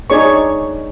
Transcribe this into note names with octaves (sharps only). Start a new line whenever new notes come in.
D4 D#4 G#4 C#5 D5 C#6